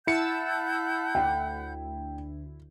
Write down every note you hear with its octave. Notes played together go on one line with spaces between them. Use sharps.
E4 F#5 A5 B5 E6 G6 C#7
D2 G5